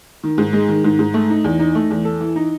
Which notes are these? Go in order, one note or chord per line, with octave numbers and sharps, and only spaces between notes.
D#3
G#2
G#3
D#3
G#2
G#2
A3
D#4
E2
D#4
A3
E2
A4
E3
D#4